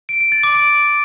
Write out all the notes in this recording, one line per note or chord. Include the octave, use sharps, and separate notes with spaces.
D7
D7
A6
D6
D7